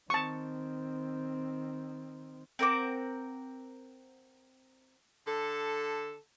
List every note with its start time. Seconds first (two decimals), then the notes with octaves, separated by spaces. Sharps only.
0.10 D#3 C4 A5 C#6
2.59 C4 A#4 F#5 D6
5.27 D3 A4